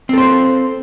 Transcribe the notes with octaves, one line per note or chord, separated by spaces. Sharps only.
C4 A4 C5